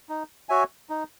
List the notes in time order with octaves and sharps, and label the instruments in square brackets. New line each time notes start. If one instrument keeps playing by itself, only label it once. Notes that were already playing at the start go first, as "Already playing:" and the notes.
[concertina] D#4
F#4 C#5 E5 G#5
D#4